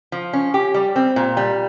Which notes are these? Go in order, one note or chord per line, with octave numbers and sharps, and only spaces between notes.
F3
C#4
G4
G3
C4
A#2
G3